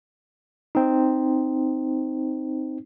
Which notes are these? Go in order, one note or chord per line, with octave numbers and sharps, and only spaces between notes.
C4 D#4